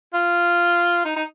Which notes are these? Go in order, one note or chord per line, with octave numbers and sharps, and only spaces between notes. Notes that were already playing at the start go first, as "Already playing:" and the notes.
F4
D#4
D#4